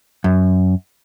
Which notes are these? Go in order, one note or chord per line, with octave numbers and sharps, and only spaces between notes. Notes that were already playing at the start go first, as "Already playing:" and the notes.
F#2